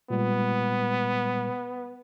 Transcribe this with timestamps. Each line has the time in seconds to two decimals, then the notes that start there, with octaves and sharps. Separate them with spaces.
0.10 A#2 G3 G#3 B3